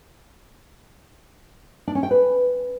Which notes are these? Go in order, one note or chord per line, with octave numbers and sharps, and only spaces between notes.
D4
C#4
G5
B4